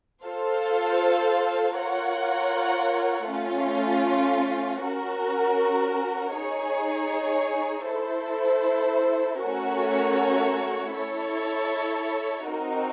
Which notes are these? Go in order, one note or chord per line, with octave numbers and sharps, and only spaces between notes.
F4 A4 C5 F5
F4 A#4 C#5 F#5
A3 C#4 F4
C#4 F#4 A#4
D#4 G#4 C#5
E4 A4 C5
A3 C#4 F#4 A#4 C#5
E4 A4 C#5
C4 D#4 F#4 A#4